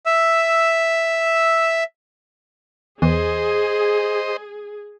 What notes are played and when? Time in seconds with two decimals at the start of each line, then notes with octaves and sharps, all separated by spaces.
0.06 E5 E6
3.02 E2 G#4 C5 D#5